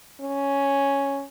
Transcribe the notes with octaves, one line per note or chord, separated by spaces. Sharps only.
C#4